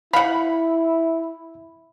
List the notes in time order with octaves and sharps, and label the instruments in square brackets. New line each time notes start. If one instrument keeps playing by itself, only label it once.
[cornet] E4 [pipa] F5 F#5 [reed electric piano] B5